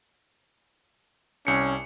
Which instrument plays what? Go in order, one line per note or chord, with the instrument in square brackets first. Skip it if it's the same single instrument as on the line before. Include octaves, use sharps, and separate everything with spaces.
[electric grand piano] C2 C#7 [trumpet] C#4